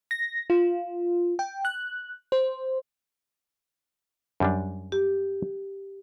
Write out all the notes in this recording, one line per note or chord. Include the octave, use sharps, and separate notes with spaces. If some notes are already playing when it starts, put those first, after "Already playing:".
A#6
F4
G5
F#6
C5
F#2 G3 D4
G4